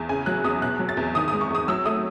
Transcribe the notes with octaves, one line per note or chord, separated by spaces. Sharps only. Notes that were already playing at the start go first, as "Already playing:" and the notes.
Already playing: E2
C#3 G#5
F#3 F#6
E2 D#6
B2 F#6
F#3
A6
E2
D#3 D#6
G#3 D#6
C#6
E2 D#6
F#3 E6
A3 D#6